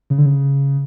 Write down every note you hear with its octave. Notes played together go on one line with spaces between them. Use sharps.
C#3
D3
C#3